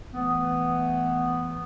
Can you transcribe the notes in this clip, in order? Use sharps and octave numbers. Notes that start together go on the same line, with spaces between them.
E3 A3 B3